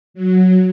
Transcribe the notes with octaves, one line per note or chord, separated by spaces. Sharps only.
F#3